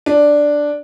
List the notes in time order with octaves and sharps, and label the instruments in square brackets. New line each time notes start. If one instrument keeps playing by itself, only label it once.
[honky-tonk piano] D4